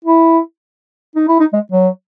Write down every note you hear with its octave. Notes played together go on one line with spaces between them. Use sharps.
E4
D#4
E4
D#4
G#3
F#3